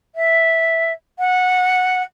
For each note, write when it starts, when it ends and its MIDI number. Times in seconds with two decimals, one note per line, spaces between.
0.15 0.92 76
1.18 2.02 78